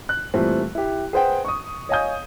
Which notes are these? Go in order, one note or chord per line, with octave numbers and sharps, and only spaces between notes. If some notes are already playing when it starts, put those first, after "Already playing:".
F#6
A#2 E3 G3 A3 C4
E4 G4
G#4 B4 C5 F#5 G5
C#6 D#6
C#5 D#5 F5 G#5 D#6 G6